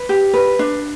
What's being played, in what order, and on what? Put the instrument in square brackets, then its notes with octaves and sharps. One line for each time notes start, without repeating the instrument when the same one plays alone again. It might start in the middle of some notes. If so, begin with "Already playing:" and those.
Already playing: [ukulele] B4
G4
B4
D4